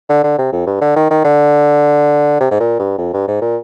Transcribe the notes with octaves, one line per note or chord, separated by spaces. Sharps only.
D3
D3
C3
F2
G2
D3
D#3
D#3
D3
C3
G#2
A#2
G2
F2
G2
G#2
A#2